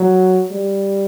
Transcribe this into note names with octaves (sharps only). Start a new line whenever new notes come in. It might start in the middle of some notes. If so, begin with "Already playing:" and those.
Already playing: F#3
G3